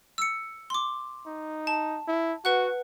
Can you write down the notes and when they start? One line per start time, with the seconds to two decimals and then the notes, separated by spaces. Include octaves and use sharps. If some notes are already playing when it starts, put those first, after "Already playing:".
0.18 E6 C#7
0.70 C6 D6
1.26 D#4
1.67 A5
2.08 E4
2.45 F#4 B4 F#5 F#6